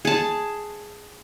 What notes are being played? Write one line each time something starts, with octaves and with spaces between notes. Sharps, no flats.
G#4 A5